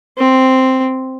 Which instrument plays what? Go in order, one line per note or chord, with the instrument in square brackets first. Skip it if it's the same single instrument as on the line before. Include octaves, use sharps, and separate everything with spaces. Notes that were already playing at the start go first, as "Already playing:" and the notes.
[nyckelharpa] C4